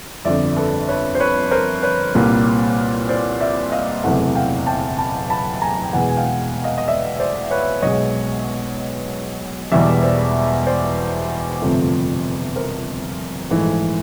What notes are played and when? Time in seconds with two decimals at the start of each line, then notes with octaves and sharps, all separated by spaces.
0.25 G1 F2 D3 D5 E5
0.57 A4 B4
0.89 B4 C#5
1.15 C5
1.20 B4 C#5
1.51 A#4 C5
1.82 B4 C#5
2.15 C2 A#2 G3 A#3
3.09 C5 D5
3.40 D5 E5
3.72 D#5 F5
4.04 F#1 E2 C3 E3 A3 E5 F#5
4.35 F5 G5
4.67 G5 A5
4.98 A5 B5
5.30 A5 B5
5.62 G#5 A#5
5.84 G5
5.93 E2 B2 G#3 F#5 G#5
6.09 G#5
6.17 F5 G5
6.64 D#5 F5
6.78 D#5
6.88 D5 E5
7.20 C5 D5
7.51 B4 C#5
7.82 B1 B2 G#3 C#5 D#5
9.72 E1 E2 B2 G3 D5 E5
10.03 C5 D5
10.67 C5 D5
11.61 G1 F2 C3 F3 A3
12.56 A#4 C5
13.51 A#1 G#2 E3 A3